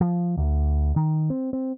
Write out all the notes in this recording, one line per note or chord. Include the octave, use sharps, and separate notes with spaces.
F3
D2
D#3
C4
C4